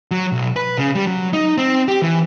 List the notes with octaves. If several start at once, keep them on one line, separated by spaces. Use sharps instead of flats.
F#3
B1
B4
C#3
G3
F#3
D#4
C4
G4
E3